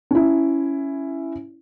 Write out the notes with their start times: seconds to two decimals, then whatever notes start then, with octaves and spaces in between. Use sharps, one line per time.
0.11 C#4 E4